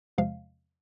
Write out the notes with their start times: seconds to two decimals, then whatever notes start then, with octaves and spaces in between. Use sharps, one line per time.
0.18 E2 C3 F3 G#3 F5